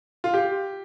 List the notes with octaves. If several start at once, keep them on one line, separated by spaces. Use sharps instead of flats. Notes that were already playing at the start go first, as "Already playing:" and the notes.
F4
G4